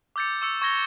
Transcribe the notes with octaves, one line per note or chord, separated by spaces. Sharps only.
D6 E6 G6 A6 C#7
C#6 E6 C#7
C#6 G#6 A#6 G7